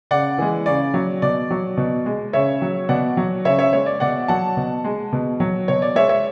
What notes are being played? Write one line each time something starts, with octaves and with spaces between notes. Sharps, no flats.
C#3 D5 F#5
E3 G#3
C#3 D5
F#3
B2 D5
F#3
B2
G#3
C#3 C#5 E5
F#3
B2 D5 F#5
F#3
C#3 C#5 E5
C#5 E5
G#3 C#5
D5
B2 D5 F#5
F#3 F#5 A5
B2
G#3
B2
F#3
B2 C#5
D5
G#3 C#5 E5
C#5 E5